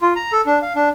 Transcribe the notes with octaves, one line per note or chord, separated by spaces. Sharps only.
F4
A#5
A4
D4
F5
D4